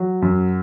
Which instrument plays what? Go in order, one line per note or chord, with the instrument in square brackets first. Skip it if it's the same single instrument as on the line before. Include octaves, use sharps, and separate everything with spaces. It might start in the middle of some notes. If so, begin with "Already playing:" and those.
Already playing: [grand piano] F#3
F#2